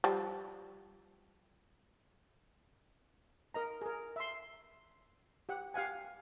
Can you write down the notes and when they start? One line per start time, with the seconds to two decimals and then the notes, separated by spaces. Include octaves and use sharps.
0.04 F3 G3
3.54 A#4 D#5 A#5
3.82 G#4 A#4
4.16 E5 C6
5.49 G4 F#5
5.74 G4 F5 F#5 G#5